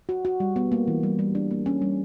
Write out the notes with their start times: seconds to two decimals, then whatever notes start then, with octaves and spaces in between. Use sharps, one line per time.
0.09 F#4
0.25 F#4
0.40 G3
0.56 B3
0.72 A#3
0.88 E3
1.03 G3
1.19 G3
1.35 D4
1.51 A#3
1.66 C#4
1.82 G3